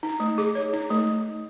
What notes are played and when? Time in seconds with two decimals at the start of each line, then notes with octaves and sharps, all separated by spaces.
0.03 D#4
0.20 A3
0.38 G#4
0.55 C#5
0.73 D#4
0.90 A3